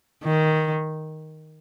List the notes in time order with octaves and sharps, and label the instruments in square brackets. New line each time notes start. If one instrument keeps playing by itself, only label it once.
[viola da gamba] D#3